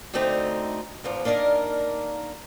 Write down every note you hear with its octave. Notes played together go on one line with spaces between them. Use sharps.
D2 D3 A3 C4 D#4
E2 G#2 F3
A#3 D4 D#4 A#4 D5